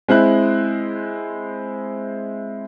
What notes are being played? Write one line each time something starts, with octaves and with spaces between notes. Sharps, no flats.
G#3 C4 E4 F#6